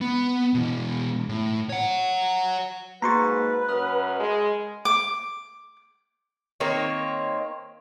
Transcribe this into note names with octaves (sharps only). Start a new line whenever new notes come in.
B3
B2 E3
A2
C#5 F#5
G#2 A#3 F#4 B4 A#5 C6 C#6 A6
F#2 B5 D#6 F6
G#3
D6
D#3 A#3 C4 C#5